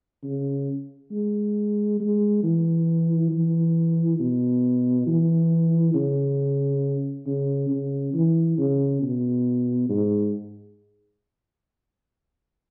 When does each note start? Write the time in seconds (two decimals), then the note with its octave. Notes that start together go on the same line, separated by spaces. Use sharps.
0.23 C#3
1.12 G#3
2.00 G#3
2.43 E3
3.31 E3
4.19 B2
5.07 E3
5.94 C#3
7.26 C#3
7.69 C#3
8.14 E3
8.58 C#3
9.02 B2
9.89 G#2